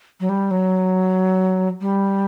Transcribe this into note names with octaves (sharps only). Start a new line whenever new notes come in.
F#3
G3
F#3
G3